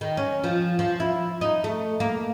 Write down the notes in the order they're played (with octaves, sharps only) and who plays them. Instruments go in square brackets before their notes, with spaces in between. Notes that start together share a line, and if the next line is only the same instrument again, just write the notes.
[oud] D#3
C#4
F3
F3
E4
D#4
A3
A#3